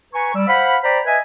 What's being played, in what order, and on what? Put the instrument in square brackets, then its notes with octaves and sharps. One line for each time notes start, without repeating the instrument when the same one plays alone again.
[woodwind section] B4 G#5 A#5 C#6
G3 D5 E6
C5 F5 F#5 B5
C5 D5 G5 A#5 B5
B4 D#5 E5 G#5